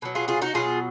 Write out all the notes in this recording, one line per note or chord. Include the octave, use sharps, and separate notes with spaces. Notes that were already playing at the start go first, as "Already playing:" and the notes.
B2 F#3
F4 G#4
F4 G#4
D#4 F#4
B2 F#3 F4 G#4